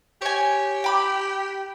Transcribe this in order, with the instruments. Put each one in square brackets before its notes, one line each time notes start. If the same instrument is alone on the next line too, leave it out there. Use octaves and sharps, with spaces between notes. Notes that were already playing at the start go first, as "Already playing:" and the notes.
[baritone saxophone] G4 [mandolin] C#5 G#5
[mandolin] G5 B5 D6